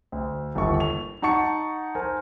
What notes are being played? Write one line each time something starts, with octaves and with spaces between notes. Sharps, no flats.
D2
G1 D#2 A4 C#6
F7
D#4 F#5 A5 C#6 C#7
A#4 C5 G#5